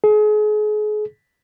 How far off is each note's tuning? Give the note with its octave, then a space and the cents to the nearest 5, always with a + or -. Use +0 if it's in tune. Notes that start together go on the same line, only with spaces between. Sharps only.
G#4 +35